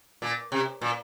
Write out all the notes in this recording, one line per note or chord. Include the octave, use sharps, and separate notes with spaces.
A#2
C3
A#2